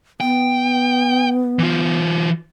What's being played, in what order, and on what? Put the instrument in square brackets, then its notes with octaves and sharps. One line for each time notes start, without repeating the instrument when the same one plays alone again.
[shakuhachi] B3 [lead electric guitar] G5
[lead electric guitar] E3 F4